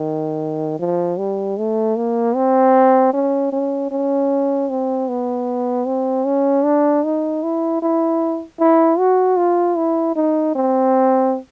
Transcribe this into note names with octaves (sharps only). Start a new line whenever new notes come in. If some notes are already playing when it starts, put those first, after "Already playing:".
Already playing: D#3
F3
G3
A3
A#3
C4
C#4
C#4
C#4
C4
B3
C4
C#4
D4
D#4
E4
E4
E4
F#4
F4
E4
D#4
C4